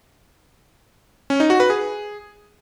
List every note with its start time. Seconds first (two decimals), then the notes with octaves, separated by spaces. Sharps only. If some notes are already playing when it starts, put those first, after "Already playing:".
1.30 C#4
1.40 D#4
1.50 F#4
1.60 B4
1.70 G#4